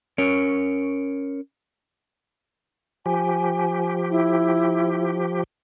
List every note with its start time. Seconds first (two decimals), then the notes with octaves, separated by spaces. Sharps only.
0.18 C#4 A#4 C#5
3.06 F3 G4 G#5
4.11 E4